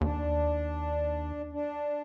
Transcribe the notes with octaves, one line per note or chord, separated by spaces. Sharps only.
D#2 D4
D4